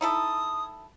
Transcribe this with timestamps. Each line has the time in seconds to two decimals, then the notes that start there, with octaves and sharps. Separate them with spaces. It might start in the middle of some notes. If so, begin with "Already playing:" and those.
0.01 D#4 E4 A4 D#6